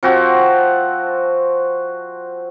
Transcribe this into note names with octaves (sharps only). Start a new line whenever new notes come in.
F3 C4 F#4